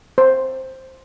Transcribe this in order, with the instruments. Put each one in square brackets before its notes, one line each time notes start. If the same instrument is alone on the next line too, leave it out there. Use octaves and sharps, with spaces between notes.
[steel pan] C5